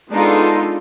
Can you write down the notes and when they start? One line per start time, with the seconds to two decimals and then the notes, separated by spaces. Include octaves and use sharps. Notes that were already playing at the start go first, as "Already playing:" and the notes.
0.11 G#3 B3 D4 D#4 F4 A4